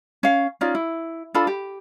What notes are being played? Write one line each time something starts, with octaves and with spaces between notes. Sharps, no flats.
C#4 F5
C#4 D#4 F4 D5
E4
D4 F4 A4 B5
G4